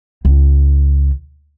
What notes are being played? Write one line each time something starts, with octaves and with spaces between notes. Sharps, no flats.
C#2